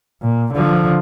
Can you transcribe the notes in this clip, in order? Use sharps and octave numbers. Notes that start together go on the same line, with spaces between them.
A#2
D3 F3